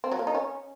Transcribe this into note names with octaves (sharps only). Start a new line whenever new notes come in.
C4
F#3
A#3
D#4
C#4